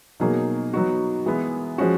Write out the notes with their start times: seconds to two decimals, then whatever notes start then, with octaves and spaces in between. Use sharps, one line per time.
0.20 B2 F#3 A#3 D#4 G#4
0.73 F#3 B3 D#4 F#4
1.26 E3 G#3 B3 E4
1.78 F3 G#3 C#4 F#4